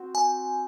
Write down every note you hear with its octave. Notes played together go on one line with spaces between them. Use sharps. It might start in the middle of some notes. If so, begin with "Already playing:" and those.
Already playing: C4 F#4 C5
G#5